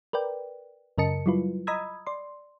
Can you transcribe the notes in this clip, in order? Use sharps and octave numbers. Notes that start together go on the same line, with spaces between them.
A#4 B4 D5 G5
F#2 C#3 A#4 D#5 A5 C#7
F#3 G3 E4 F4 B4
D#5 A#5 B5 D#6 E6 G#6
D5 C6